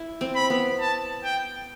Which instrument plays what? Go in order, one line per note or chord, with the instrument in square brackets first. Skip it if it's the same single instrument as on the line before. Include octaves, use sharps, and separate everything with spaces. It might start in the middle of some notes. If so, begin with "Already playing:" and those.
Already playing: [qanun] E4
C4
[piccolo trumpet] B5
[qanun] B3
[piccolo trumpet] A5
G5